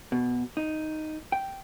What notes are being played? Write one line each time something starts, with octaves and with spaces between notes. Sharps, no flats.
B2
D#4
G5